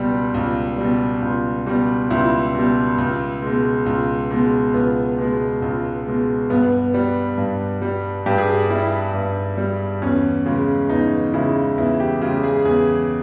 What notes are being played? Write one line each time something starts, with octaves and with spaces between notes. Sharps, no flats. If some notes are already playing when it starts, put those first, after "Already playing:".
Already playing: C#2 B2 G3 G4
C#2
B2 G3
C#2
B2 G3
C#2 E4
B2 G3
C#2
B2 G#3
C#2
B2 G#3
C#2 B3
B2 G#3
C#2
B2 G#3
G2 B3
G3
G2
G3
G2 G4
G#4
G4
G3 E4
G2
G3
E2 C#4
C#3 G#3
E2 D#4
C#3 G#3 E4
E2 E4
G4
C#3 G#3 G4
G#4
E2 G#4